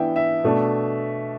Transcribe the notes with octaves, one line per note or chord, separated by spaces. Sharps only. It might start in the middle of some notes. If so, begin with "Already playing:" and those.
Already playing: E3 B3 D4 E5 G5
E5
B2 A3 D4